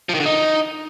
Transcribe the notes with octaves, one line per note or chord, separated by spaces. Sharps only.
F3
D#3
D3
D#4